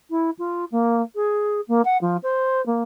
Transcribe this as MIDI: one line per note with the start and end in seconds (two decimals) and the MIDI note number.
0.10 0.30 64
0.39 0.65 65
0.72 1.02 58
1.15 1.61 68
1.68 1.82 58
1.85 1.97 78
2.01 2.17 53
2.23 2.64 72
2.66 2.83 58